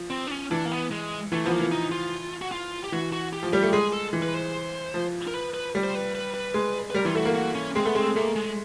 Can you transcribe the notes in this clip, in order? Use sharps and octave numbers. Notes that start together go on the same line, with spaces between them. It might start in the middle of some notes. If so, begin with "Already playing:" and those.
Already playing: F3
C4
D4
C#4
E3 D4
A#3
B3
G#3
E3 A3
F3 B3
A#3
E3
D#4
F4
F#4
F4
G4
E3 F#4
F#4
G4
F3
G3 G4
A3
G#3 G#4
A4
E3
B4
C5
F3
A#4
B4
B4
G3
C5
B4
B4
B4
G#3
B4
G3 A#4
E3 F4
A3 F#4
A#3
F#4
C#4
G#3 C4
A3 B3
G#3 C4
G#3
A3 A#3
G#3